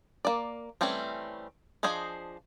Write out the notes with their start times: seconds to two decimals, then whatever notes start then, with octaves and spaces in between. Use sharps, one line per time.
0.25 A#3 D5
0.81 E3 G3 A3 C4 C#4
1.83 F3 D4 G#4 C5 D#5